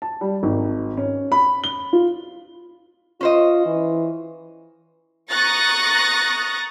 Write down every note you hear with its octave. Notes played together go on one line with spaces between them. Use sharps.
A5
G3
G#1
C#4
B5
G7
F4
C#4 F4 C5 D#5
E3
A#5 C#6 D#6 F#6 A6 A#6